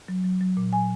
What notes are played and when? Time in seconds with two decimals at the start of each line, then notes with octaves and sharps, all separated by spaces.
0.08 F#3
0.24 F#3
0.41 F#3
0.57 A#2
0.73 F#3 G#5